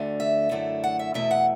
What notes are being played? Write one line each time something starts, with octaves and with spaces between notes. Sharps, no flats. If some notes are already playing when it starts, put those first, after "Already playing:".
Already playing: D2 D3 A3
E5
F#2 D3 A3 E4
F#5
E5
E2 B2 A3 E4 E5
F#5